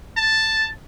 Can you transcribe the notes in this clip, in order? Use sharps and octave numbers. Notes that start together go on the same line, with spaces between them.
A5